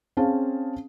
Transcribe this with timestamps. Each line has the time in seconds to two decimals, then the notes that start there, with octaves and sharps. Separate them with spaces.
0.17 C4 C#4 G#4 F5 A5